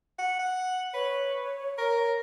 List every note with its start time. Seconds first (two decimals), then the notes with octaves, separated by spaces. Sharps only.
0.18 F#5
0.39 F#5
0.94 B4 C#5
1.78 A#4